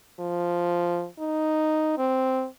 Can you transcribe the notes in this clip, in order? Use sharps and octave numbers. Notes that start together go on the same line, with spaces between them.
F3
D#4
C4